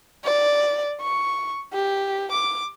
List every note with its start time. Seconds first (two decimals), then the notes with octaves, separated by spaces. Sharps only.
0.24 D5
1.01 C#6
1.73 G4
2.32 D6